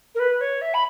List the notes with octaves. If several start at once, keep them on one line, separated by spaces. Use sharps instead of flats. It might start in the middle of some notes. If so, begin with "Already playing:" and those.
A#4
B4
C#5
E5
B5